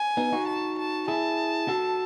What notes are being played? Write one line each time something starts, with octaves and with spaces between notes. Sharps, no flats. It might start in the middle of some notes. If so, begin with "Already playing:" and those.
Already playing: G#5
B3 D#4
D#4 F#4
A5
A5
E4 G#4 A5
F#4 A4